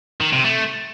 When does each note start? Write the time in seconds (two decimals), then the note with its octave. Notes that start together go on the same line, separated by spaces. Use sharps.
0.20 D#3
0.32 C3
0.44 A3